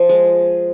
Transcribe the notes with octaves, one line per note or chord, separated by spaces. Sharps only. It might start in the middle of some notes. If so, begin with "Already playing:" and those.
Already playing: F3
G#3